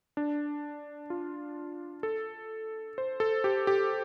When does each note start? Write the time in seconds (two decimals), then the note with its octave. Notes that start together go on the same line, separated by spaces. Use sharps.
0.17 D4
1.10 F4
2.03 A4
2.98 C5
3.20 A4
3.44 G4
3.67 G4